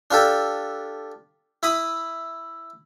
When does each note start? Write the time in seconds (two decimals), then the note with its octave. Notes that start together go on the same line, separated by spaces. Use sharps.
0.11 D4 F4 G4 A4
1.63 E4 B5 D#6